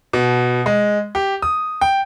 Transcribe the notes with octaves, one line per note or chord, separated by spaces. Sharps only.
B2
G#3
G4
D#6
G5